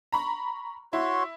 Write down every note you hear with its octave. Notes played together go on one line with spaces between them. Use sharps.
A#5 B5 C#6
E4 F#4 C#5 C6